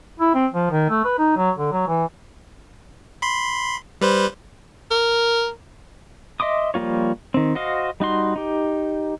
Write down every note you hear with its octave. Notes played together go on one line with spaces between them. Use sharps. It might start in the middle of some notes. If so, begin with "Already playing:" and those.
E4
C4
F3
D#3
A3
B4
D#4
F#3
D3
F#3
E3
B5 C6
G3 B4 C5
A#4
D#5 E5 C6 D6 D#6
F3 G3 A#3 F4 C#5
D#3 C4
F#4 C5 D#5 F5
G3 D#4 F#4 C6
D#4 G4